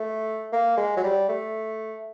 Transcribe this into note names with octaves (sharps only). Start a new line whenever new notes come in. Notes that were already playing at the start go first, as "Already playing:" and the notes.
Already playing: A3
A#3
G#3
F#3
G3
A3